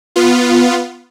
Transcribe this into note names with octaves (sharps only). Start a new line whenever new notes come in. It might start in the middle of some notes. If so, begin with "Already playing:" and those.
B3 F4